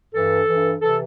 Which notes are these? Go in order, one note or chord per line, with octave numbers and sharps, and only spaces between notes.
G2 E3 A4
G2 E3
C3 E3 A4